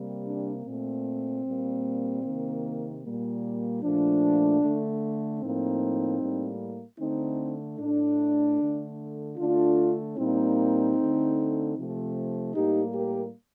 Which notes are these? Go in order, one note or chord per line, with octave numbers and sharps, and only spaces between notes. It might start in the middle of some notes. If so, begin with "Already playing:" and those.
Already playing: C3 G3 A#3
D4
A#2 A3 C4
A#2 G3 A#3
C3 D#3 A#3
A#2 G3 A#3
A#2 F3 A3 D4
D3 A3
A2 F3 A#3 C4 D#4
A2 G3 A#3
D3 A3 C4 D#4
A2 A3 D4
D3 A3
D3 A3 D4 F4
A#2 G3 A#3 C4 D#4
D3 A3
C3 F3 A3
A2 G3 A#3 D#4 G4
G4 A#4